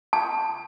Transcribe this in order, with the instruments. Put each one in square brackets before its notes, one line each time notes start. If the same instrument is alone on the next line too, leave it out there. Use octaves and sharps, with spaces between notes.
[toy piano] A5